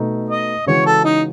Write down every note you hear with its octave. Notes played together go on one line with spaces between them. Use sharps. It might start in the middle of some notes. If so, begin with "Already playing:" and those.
Already playing: B2 A3 D#4
D#5
C#3 E3 G#3 C#4 F#4 C#5
A4
D#4